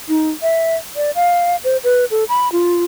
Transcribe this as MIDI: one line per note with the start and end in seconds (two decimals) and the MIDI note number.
0.09 0.30 63
0.42 0.76 76
0.96 1.11 74
1.15 1.56 77
1.64 1.77 72
1.84 2.05 71
2.11 2.24 69
2.29 2.51 83
2.52 2.84 65